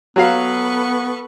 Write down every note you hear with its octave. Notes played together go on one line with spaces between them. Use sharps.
F#3 B3 F#4 A4 B4 F5 C#6